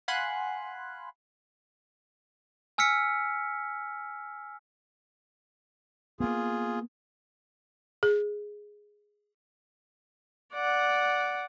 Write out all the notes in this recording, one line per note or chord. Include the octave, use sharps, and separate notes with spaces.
F5 F#5 G#5 B5 C6 F#6
G#5 E6 F6 B6 C#7
A#3 B3 F4 G#4
G#4
D5 F#5